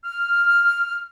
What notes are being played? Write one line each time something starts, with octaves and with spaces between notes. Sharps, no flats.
F6